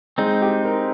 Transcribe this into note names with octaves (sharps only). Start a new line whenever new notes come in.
G#3 C4 D#4
G4
A#4